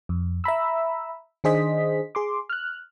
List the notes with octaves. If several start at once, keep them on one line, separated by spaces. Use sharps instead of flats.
F2
E5 A#5 B5 E6
D#3 D4 G#4 C5 D#5 B6
G#4 C6 D6
F6 F#6